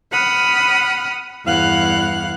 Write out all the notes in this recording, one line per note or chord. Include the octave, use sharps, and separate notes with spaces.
F#5 B5 D#6 F6
E2 G2 E4 F5 F#5 F#6